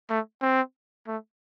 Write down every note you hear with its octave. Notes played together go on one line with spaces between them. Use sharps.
A3
C4
A3